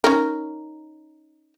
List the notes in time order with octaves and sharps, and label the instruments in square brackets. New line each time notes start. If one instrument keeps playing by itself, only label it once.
[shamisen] C#4 D#4 A#4